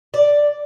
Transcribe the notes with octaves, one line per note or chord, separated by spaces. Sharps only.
D5